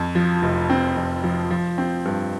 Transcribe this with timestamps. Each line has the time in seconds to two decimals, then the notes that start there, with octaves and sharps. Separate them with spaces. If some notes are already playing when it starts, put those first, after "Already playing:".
Already playing: F2
0.15 F3
0.42 F1
0.70 C4
0.96 F2
1.24 F3
1.50 F3
1.78 C4
2.05 G2